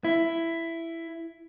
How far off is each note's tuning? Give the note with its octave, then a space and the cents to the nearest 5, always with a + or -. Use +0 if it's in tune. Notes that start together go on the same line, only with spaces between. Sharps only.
E4 +10